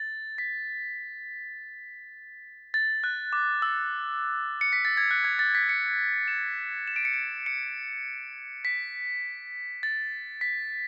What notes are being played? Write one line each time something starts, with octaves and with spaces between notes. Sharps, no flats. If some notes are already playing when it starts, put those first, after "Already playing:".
Already playing: A6
B6
A6
F#6
D6
E6
C#7
B6
A6
G#6
F#6
G#6
A6
B6
C#7
E7
E7
D7
C#7
D7
C#7
B6
A6
B6